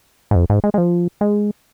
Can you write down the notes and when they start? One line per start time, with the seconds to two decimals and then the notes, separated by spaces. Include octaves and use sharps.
0.31 G#2
0.35 F2
0.50 G#2
0.64 G#3
0.74 G#3
0.78 F3
1.21 G#3